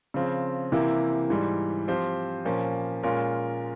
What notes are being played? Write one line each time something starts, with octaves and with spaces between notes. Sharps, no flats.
C#3 F3 C4
C3 E3 A#3 E4 G4
G#2 E3 G3
F3 C4 G4 C5
A#2 F3 A#3 C#4
A#2 G#3 C#4 F4 A#4